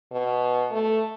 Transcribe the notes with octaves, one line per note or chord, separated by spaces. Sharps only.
B2
A3